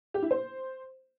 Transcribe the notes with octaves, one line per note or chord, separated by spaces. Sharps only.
G4
E4
C5